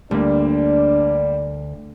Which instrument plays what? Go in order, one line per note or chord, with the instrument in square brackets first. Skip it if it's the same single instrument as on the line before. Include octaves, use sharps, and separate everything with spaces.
[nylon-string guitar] D2 [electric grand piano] G3 A#3 [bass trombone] D4 [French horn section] D5